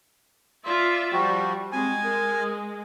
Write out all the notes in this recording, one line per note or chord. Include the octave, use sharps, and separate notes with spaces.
F4 D5 E5 C6
F3 G3 F#4 G5
G#3 C4 G#5
A#4